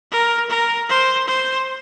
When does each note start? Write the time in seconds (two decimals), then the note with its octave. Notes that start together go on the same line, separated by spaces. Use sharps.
0.12 A#4
0.50 A#4
0.90 C5
1.28 C5